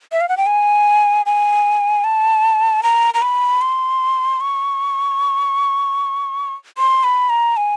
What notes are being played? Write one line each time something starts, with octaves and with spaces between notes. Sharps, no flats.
E5
F5
F#5
G5
G#5
G#5
A5
A#5
A#5
B5
C6
C#6
C6
B5
A#5
G#5